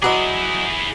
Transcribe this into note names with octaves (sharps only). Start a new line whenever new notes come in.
F#3 E4 F#4 G#4 B4 D#5 D6